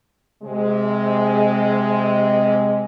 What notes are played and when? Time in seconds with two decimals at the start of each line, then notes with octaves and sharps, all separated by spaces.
0.43 C3 G#3